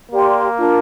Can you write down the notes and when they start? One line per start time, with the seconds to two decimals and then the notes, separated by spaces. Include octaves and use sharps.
0.12 A#3 G4 D5 G5 C6
0.56 D4 F4 A#4